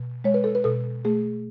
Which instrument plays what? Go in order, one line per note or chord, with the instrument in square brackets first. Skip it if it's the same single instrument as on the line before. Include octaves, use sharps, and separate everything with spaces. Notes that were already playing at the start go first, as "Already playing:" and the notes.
Already playing: [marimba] B2
G#3 C#5
B4
A4
B4
B2 A4
A3 G#4